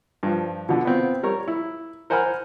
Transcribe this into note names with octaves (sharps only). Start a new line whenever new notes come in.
G2 F3
B2 D3
B3 C4 F4
G3 A#4 C#5
E4
A#4 C5 F#5 G#5 B5 F6